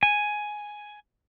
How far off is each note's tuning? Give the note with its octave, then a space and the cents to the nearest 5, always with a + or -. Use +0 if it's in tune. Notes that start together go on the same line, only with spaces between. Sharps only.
G#5 +5